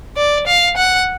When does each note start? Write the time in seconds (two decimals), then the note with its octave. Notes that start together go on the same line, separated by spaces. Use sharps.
0.17 D5
0.47 F5
0.77 F#5